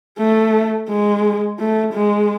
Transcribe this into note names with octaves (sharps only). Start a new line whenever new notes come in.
A3
G#3
A3
G#3